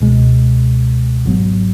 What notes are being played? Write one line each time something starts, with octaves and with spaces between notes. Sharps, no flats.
C#2 B2 G#3
G#1 G#2 F#3 B3